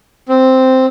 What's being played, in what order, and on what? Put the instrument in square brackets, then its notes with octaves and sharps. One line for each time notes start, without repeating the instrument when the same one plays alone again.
[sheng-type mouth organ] C4